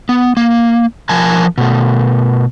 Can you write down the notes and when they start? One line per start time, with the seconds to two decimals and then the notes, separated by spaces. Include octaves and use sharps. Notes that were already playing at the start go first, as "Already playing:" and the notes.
0.09 B3
0.37 A#3
1.09 F3 A#4 G#5 A5
1.58 B2 A3